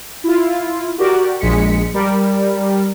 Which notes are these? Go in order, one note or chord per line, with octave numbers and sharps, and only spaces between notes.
E4 F4
F#4 G4 A#4 D5
A#1 G#3 B6 C#7
G3 A#4